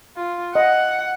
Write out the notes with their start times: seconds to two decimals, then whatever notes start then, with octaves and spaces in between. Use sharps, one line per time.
0.16 F4
0.55 D#5 F#5